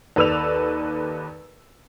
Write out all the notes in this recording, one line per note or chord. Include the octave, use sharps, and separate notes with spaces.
D#2 A4 B4 D5 E6 F7